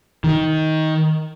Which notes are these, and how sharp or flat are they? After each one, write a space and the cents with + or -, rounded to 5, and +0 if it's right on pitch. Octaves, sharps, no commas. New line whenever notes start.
D#3 +15